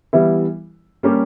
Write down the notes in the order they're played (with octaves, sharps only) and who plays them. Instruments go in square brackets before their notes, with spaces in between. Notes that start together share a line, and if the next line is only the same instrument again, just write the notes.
[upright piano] E3 G3 B3 E4
G3 A#3 C#4 G4